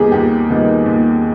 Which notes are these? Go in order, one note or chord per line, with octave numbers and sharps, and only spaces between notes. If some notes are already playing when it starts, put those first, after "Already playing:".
Already playing: D#2 D#3 G3 A#3 B3 G4 G#4
D#2 G4
D#3 G3 B3
D#2